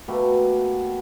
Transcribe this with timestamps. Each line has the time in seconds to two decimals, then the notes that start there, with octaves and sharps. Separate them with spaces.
0.08 B2 A3 A#3 G4